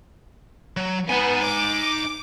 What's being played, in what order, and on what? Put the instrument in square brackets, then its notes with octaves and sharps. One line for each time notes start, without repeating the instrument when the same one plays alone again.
[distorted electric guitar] F#3
[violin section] B3 [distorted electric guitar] D#4 G#5
[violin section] D6